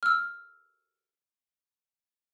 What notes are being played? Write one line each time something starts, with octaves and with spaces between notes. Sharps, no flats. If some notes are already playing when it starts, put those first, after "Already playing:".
E6 F6